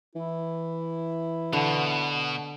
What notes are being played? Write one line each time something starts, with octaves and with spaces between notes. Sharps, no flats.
E3 E4
B2 D3